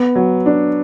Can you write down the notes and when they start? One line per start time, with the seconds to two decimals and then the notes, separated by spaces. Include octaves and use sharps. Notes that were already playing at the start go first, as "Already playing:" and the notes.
Already playing: B3
0.15 F#3
0.46 D4